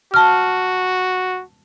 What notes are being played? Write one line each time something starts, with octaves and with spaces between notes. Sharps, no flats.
F#4 A5 F6